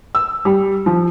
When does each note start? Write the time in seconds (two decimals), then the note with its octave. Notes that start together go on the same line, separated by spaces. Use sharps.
0.15 E6
0.45 G3
0.86 F3